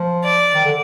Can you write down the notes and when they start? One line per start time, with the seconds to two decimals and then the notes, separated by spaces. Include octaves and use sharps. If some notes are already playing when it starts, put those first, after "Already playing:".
Already playing: F3
0.24 D5
0.54 D#3
0.65 D3